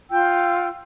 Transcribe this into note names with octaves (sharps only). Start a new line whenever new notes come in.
F4 G5 E6